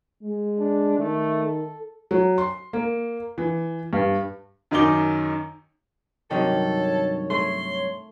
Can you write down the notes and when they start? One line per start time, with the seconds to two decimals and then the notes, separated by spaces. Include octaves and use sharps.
0.23 G#3
0.59 D4
0.99 D#3 A3
1.43 A4
2.11 F#3
2.38 C6
2.73 A#3
3.38 E3
3.93 G2
4.71 F#2 D#3 D#4 D6 G7
6.31 G2 C3 D#3 F#3 A4 C#5
7.30 A3 C6